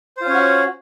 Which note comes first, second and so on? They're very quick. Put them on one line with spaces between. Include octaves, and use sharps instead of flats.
C5 F4 C#4 C#5 F#4